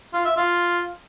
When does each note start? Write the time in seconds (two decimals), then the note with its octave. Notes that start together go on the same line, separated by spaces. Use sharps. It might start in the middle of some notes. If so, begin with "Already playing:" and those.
0.13 F4
0.25 E5
0.37 F4